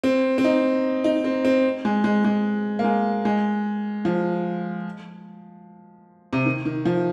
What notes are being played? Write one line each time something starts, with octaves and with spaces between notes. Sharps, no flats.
C4
C4
D#4
D#4
C4
C4
G#3
G#3
G#3
A#3
G#3
G#3
F3
C3
D#3
D#3
F3